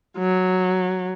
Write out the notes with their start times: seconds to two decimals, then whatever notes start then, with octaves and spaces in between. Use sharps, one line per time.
0.18 F#3